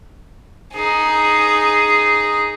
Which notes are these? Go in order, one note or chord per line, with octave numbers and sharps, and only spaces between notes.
D#4 G#4